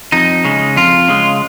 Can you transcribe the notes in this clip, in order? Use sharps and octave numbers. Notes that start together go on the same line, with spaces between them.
F2 D#4
C#3 G#3
F2 F4
C#3 G#3